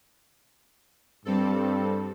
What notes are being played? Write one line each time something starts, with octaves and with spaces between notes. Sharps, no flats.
G2 G3 C4 A4